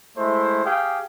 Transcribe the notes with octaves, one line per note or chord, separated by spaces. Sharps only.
G#3 A3 E4 C5
G4 G#4 F5 G5